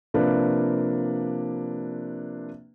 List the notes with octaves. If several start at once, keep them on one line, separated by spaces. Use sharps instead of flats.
C3 F3 A#3 D4 B4